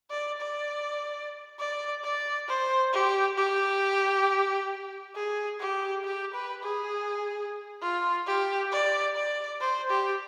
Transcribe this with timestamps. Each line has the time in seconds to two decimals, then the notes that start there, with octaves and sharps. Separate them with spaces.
0.11 D5
0.41 D5
1.59 D5
2.04 D5
2.48 C5
2.93 G4
3.37 G4
5.15 G#4
5.60 G4
6.04 G4
6.34 B4
6.63 G#4
7.82 F4
8.27 G4
8.72 D5
9.16 D5
9.61 C5
9.90 G4